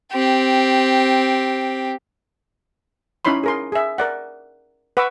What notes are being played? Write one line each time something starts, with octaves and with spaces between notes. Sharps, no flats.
C4 G4
C#4 D#4 E4 C#5 B5 C6
G#4 A#4 C6
G#4 E5
A#4 D5 F#5
B4 F#5 C#6 D6 E6